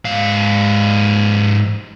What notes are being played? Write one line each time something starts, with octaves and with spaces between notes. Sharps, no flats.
G#2 F5